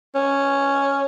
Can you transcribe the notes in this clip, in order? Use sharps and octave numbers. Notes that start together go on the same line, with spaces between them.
C#4